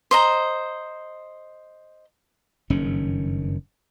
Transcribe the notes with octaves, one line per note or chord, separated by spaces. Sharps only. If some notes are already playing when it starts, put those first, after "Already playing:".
C5 D#5 A#5
F#1 G2 D#3 C#4